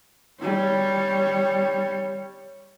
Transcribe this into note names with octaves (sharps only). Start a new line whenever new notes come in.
G3 C#5